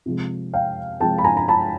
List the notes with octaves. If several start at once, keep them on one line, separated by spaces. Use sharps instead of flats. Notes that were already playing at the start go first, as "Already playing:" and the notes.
C3 F3 G#3
F5 G5
C3 F3 G#3 G5 A5
B5
G#5 A#5
A#5
A5 B5